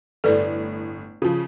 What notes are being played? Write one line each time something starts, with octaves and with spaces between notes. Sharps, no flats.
G1 A2 A4 B4 D5
C#3 F3